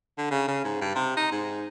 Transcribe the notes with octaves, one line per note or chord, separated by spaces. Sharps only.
D3
C#3
C#3
G#2
G2
C3
D#4
G#2